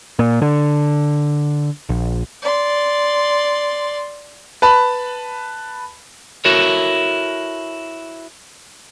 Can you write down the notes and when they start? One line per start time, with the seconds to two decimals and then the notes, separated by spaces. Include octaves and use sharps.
0.19 A#2
0.42 D3
1.89 A#1
2.42 D5 C6
4.62 B4 A5 B5
6.45 E4 F#4 A4 A#4 C#5